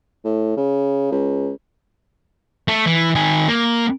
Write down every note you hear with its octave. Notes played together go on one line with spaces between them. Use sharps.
A2
C#3
C#2
A3
E3
D#3 G#5
A#3